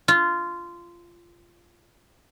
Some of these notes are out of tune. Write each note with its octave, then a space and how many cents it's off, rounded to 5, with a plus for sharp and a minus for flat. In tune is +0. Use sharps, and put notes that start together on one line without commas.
F4 -15